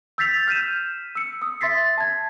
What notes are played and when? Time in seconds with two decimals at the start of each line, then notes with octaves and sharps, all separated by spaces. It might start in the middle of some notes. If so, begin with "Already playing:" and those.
0.18 E6 G6 A6 B6 C7 F7
0.48 F6 G6 B6 D#7 E7
1.15 E6 C#7
1.42 D#6 E6
1.61 E5 C6 A6 B6 C7
1.98 A5 G#6